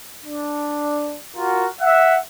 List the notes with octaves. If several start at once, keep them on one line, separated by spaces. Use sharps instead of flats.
D4
F4 F#4 A#4
E5 F#5